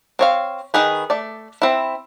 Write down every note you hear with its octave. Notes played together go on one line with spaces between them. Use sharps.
C4 C#5 F5
D#3 D#4 G#4 B4
A3 D5
C4 E4